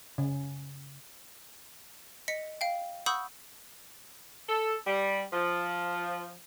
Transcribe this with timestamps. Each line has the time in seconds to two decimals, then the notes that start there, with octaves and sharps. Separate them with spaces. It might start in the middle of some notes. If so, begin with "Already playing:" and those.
0.18 C#3
2.28 D#5 B6 C#7
2.61 F5 G5
3.06 F#5 B5 C#6 D#6 E6 G6
4.49 A4
4.87 G3
5.32 F3